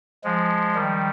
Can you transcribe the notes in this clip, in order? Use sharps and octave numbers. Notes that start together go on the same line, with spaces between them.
F3 G#3
D#3 G3